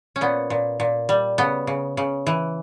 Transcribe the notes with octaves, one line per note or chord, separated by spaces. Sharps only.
C#4
A#2 B3
A#2
A#2
G3
C#3 B3
C#3
C#3
E3